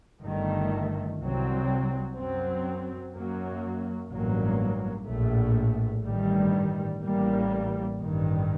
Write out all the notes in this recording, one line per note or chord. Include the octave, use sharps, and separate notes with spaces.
G1 G2 D#3 A3
C2 C3 F#3 C4
F#2 F#3 C4
F#2 F#3 A#3
A1 G2 F#3 A#3
A#1 A2 A3
A1 G2 D#3 G3
A1 A2 G3 A#3
A1 G2 D#3